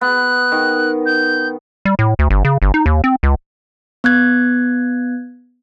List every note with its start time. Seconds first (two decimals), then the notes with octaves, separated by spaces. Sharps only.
0.01 B3 F#6
0.52 D#3
1.06 G6
1.85 G3
1.99 A2
2.19 D2
2.30 G1
2.45 C#3
2.62 G1
2.74 D#4
2.86 D#2
3.04 C4
3.23 C#2
4.04 B3 F#6 G#6